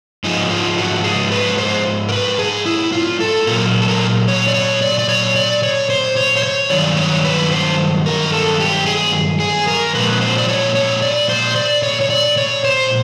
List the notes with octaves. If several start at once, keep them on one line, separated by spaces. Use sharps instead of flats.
G#2 F3 G#3 D#4
F4
F#4
G#4
B4
C5
A#4
B4
G#4
E4
F4
A4
A#2 F#3 A#4
A4
A#4
C#5
D5
C#5
D5
D5
C#5
D5
C#5
C5
C#5
C5
C#5
G2 D#3 F#3 D5
C#5
B4
C5
A#4
A4
G4
G#4
G#4
A#4
A#2 F3 G#3 B4
C5
D5
C#5
C#5
D5
C5
D5
C#5
C#5
D5
C#5
C5